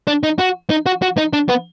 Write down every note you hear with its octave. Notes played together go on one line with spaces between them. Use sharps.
D4
D#4
F#4
D#4
F#4
F#4
D#4
D4
B3